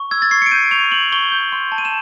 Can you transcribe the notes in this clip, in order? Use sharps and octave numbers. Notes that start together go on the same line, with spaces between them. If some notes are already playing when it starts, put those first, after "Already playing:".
Already playing: C#6
E6 G#6
A6
C#6 C7
C#7
D7
G6 D#7
C#6 F7
C#6 F#7
C#6 G7
G6
C6
A5
D#7
E7